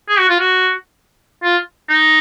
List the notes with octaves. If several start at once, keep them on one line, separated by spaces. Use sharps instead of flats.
G#4
F#4
F4
F#4
F4
D#4